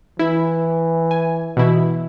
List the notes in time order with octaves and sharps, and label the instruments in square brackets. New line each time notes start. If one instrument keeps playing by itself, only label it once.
[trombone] E3 [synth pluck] E4
[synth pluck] G#5
B2 E3 E4